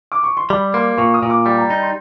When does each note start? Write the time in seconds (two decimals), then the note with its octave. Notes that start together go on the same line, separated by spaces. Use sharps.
0.12 D6
0.24 C#6
0.37 C6
0.50 G3 B5
0.74 A#3 C6
0.97 A#2 C#6
1.14 D#6
1.23 A#2
1.30 D6
1.45 G3 D6
1.58 A#5
1.70 D#4 B5
1.82 C6